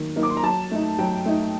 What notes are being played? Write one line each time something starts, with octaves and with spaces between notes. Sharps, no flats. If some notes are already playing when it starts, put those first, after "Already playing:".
Already playing: D#3 F#3 A#3
F#3 A#3 D#4
D6
C6
A#5
F#3 A5
A3 D#4
F#3 G5
A3 D#4